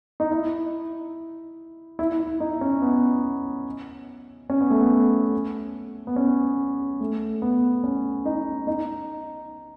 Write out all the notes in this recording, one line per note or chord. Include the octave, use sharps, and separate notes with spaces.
D#4
E4
E4
E4
D#4
C#4
B3
C#4
B3
A3
B3
B3
C#4
A3
B3
C#4
D#4
D#4